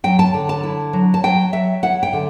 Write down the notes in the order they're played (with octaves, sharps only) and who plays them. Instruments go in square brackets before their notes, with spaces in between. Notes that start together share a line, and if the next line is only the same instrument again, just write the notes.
[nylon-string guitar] F#3 G5
A5
D3
A5
E4
F#3
A5
F#3 G5
F#3 E5
E4 F#5
G5
D3